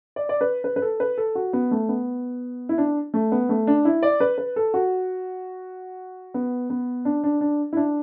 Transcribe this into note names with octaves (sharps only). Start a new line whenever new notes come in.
D5
D5
B4
B4
B4
A4
B4
A4
F#4
B3
A3
B3
E4
D4
A3
B3
A3
D4
E4
D5
B4
B4
A4
F#4
B3
B3
D4
D4
D4
E4
D4